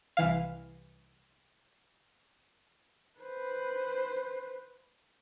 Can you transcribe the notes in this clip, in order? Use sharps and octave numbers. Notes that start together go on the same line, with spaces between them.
C2 E3 F5
B4 C5